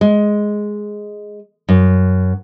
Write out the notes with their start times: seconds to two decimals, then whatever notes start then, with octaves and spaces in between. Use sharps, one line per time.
0.01 G#3
1.69 F#2